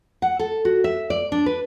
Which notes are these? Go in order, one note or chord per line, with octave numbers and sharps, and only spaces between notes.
F#5
A4
F#4
E5
D5
D4
B4